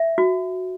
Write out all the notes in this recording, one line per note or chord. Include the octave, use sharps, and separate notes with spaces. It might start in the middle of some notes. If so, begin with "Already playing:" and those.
Already playing: E5
F#4